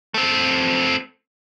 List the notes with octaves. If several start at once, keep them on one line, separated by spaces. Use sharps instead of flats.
A3 C4